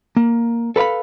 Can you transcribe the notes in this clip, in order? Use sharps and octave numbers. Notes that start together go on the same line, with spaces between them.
A#3
A4 B4 D5 F5 B5